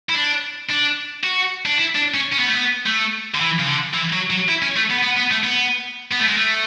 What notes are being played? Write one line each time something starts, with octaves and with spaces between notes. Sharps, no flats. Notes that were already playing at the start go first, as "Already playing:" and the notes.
E4
D4
D4
F#4
D4
E4
D4
C#4
C#4
B3
A3
B3
A3
D3
E3
C#3
D3
E3
F#3
F#3
E4
C#4
A3
B3
B3
B3
A3
B3
B3
A3
G#3
A3